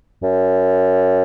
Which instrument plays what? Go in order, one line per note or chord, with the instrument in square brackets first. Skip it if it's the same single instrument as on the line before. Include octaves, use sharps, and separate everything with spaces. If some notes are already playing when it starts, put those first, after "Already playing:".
[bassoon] F#2